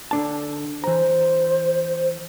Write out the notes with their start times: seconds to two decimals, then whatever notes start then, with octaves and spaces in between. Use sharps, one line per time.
0.11 D3 D4 A5
0.84 E3 C5 A#5